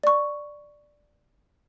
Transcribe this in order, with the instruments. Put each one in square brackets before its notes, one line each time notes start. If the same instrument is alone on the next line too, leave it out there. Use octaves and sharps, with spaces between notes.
[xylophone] D5 C#6